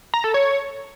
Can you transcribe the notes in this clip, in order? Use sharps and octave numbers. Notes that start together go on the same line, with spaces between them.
A#5
A4
C#5